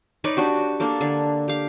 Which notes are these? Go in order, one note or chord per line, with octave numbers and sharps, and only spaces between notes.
D#4 B4 C#5 D5
D4 F#4 G4
A#3 D4 A4
D3
G4 F5